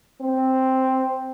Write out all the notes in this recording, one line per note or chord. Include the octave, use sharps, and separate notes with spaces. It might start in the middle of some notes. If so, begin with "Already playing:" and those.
C4